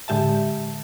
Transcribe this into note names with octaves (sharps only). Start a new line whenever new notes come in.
A2 D3 G#3 G4 E5 A5